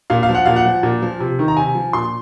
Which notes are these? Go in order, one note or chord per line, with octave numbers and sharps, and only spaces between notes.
A#2 F5
F5
F3
F#5
A#2 F5
F#5
F3
A#2
F3
C3
D#3
A#5
C3 G#5
F3
A#2 C6